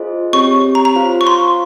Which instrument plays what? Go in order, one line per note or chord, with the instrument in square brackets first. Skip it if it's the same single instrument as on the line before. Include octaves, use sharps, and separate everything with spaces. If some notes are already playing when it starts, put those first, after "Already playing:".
Already playing: [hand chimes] F4 G#4 C5 D#5
[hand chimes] C4 G4 C#5 [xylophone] C#6
[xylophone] A#5
A#5
[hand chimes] F4 C5 F5
[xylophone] C#6
C6